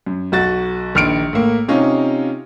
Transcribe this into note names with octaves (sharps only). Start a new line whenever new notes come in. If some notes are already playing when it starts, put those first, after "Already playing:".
F#2
B1 F#4 A6
A#1 D#3 F6 C#7 D7
A2 A#3
C3 C#4 D#4 F4